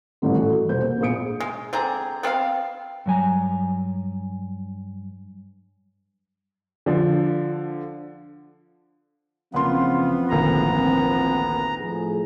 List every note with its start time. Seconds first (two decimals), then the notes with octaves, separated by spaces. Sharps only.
0.22 A1 G2 D3
0.35 E3 F#4 A4
0.52 A4
0.69 E1 C2 C5 G6
0.81 A#3
1.00 A#1 B3 G#4 D#6 C#7 D7
1.40 G#3
1.73 D3 C4 G#4 A#5
2.23 B3 C4 A4 F5
3.06 G2 F#3 G#5 A#5
6.86 D3 F3
9.54 F#1 C#3 E3 F3 B3 C4 F4 C6
10.30 G#1 D2 A#2 A#5
11.81 A2 F3 G#4